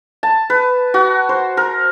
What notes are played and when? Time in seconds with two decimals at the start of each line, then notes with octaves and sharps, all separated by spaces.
0.23 A5
0.50 B4
0.94 F#4
1.29 C5
1.57 A#4